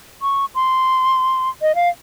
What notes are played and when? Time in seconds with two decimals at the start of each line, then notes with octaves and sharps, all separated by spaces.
0.22 C#6
0.55 C6
1.62 D#5
1.75 F5